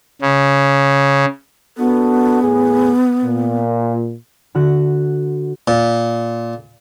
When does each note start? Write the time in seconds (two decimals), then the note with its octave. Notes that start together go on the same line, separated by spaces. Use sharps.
0.22 C#3
1.78 B3 D4 F#4 A4
2.42 A2 G#4
3.23 A#2
4.55 D3 F#4 F#6 A#6
5.68 A#2